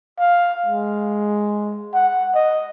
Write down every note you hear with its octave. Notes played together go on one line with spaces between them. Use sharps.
F5
G#3
F#5
D#5